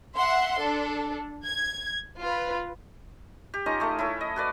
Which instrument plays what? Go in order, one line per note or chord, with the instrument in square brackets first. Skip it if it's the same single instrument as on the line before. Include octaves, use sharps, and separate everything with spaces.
[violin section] E5 F#5 C6
D4 A4
G#6
F4 B4
[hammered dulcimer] G4
C#4 D#4 F4 D#5
A3 G#4
E4 A4 C#5
D#5
F#4 B4 D5